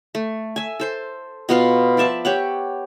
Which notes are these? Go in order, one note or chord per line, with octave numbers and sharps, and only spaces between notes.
A3
E5 G#5
A4 C5 C6
B2 B3 F4 C6
F3 D5 E5 A5
G4 C#5 F#5